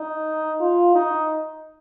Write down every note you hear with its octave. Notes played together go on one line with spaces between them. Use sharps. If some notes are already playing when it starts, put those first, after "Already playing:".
Already playing: D#4
F4
D#4